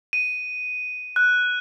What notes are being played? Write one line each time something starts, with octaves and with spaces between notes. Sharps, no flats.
D#7
F#6